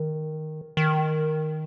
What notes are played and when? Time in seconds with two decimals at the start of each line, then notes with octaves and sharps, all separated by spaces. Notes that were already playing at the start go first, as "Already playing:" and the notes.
Already playing: D#3
0.77 D#3